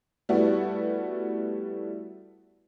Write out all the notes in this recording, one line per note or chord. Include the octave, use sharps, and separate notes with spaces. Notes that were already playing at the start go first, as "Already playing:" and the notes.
G3 A3 B3 E4 F#4